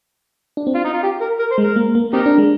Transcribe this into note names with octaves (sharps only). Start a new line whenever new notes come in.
D4
C4
F4
D#4
F4
G4
A#4
A#4
C5
G#3
A#4
A#3
A#3
C4 D#4 G4 A#4
D4
G#3